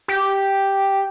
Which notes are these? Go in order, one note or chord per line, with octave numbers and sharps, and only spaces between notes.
G4